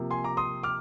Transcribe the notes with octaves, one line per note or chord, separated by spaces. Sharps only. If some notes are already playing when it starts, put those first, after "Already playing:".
Already playing: C3 F3 A#3
G#5 C6
A#5 D6
C6 D#6
D6 F6